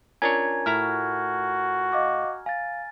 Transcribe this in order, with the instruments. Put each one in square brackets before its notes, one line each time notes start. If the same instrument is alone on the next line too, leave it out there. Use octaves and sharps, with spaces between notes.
[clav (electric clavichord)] C#4 D4 C#5 [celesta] F4 A#4 [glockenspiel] G#5 A#5 G#6
[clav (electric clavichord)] A2 E4 A#5 [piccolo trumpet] F#4 [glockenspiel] F6
[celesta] D#5 F5 D6
[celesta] F5 [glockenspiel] G#5 A6